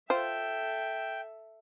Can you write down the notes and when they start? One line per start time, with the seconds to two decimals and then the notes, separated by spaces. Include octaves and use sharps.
0.10 F4 A4 C5 E5 G5